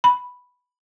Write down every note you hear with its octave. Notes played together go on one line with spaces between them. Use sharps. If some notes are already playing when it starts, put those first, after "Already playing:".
B5